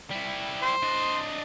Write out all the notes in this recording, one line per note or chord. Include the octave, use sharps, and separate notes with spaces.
G3 E4
C5
D4 D#5